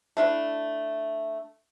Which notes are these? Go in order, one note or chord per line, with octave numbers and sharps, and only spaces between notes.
A3 D4 E4